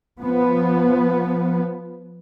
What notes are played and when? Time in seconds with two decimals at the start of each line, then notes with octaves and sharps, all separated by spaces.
0.21 F3 B3